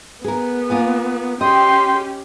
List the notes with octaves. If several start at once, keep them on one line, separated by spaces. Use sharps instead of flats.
B3 G#4 A#4
A#3 F4 G#5
C#4 G4 D#5 G5 C6